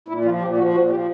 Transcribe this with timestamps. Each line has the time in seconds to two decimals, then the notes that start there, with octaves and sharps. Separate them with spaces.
0.08 A#2 E4
0.25 F3 F4
0.41 A#2 G4
0.57 F3 F#4
0.74 A#2 F#4
0.90 F3 G4